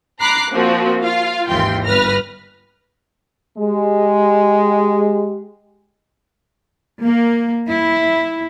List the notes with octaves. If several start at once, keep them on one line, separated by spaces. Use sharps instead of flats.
A#5 B5 D6 F#6 C7
A#2 F3 C4 F#4
F4 F5
G#1 D#2 E3 F4 G5 C6
G1 B4 F6 A#6
G#3 G4
A#3
E4